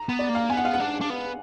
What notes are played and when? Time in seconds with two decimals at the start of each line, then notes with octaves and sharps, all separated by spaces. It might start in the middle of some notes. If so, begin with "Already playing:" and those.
Already playing: A#5
0.09 B3
0.19 D5
0.29 A#3
0.35 F5
0.50 B3 G#5
0.57 F#5
0.65 F5
0.74 F#5
0.80 D4
1.01 D4
1.10 B3